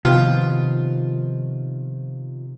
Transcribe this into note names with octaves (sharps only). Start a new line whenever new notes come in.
C3 D#3 F3 B3 F4